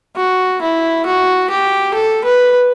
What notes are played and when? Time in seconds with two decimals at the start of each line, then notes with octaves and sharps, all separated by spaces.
0.16 F#4
0.62 E4
1.06 F#4
1.50 G4
1.94 A4
2.25 B4